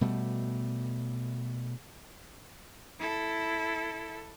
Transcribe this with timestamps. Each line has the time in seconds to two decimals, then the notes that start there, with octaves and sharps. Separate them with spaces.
0.01 B2 G3 A3
2.99 E4 A4